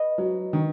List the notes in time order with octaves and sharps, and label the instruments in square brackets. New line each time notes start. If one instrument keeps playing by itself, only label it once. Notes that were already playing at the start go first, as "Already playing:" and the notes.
Already playing: [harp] B4 D#5
[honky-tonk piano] F#3
D#3